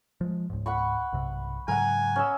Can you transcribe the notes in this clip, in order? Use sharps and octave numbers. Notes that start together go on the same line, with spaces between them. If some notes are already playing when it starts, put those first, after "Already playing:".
F3 G#3
C#2 G#2
F#5 B5 C#6
B1 G2 C3
G#2 C#3 F#3 A#4 F#5 G#5
C#4 D#5 E6